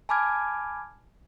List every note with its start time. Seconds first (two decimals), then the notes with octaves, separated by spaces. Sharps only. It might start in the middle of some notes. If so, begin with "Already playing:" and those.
0.09 G#5 A5 B5 D6 F6 G#6